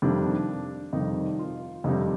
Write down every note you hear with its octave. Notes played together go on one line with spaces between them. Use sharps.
F2 C3 D#3 G3 D4
F2 C3 D#3 G3 D#4
F4
F2 C3 D#3 G3 D#4